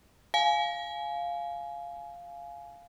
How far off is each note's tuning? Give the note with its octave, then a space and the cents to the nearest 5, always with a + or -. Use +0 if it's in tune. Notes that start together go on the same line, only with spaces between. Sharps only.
F5 +0 G#5 +20